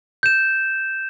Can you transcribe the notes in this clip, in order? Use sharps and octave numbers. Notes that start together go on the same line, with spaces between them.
G6 E7